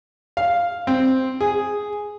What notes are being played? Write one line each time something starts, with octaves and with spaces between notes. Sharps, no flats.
F5
C4
G#4